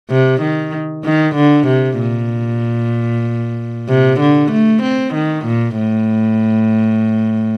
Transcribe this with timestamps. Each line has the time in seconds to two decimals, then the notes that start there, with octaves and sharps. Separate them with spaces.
0.10 C3
0.42 D#3
1.05 D#3
1.36 D3
1.68 C3
2.00 A#2
3.89 C3
4.20 D3
4.52 A3
4.83 C4
5.14 D#3
5.46 A#2
5.77 A2